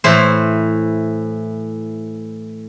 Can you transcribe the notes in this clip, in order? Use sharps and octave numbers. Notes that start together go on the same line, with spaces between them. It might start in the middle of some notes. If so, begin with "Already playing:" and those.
A2 E3 C5